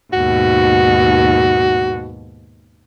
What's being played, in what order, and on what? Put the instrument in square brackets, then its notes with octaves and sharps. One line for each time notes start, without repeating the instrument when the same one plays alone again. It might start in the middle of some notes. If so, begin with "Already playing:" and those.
[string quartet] D#2 G#2 B2 [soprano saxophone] F#4